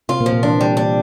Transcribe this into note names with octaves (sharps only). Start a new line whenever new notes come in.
C3 C4 F4
A#2 A#3
F3
A#2 A#3
E3 D4
G3
D4